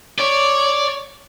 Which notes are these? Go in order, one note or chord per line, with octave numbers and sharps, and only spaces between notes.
C#5 D5